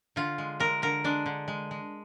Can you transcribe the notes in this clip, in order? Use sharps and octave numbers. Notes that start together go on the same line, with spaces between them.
D3 F4
G#3
G#3 A#4
D3 A#4
G#3 D4
D3
G#3
G#3